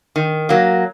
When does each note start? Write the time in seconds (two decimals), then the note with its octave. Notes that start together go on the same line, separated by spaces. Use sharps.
0.16 D#3
0.49 F#3 A#3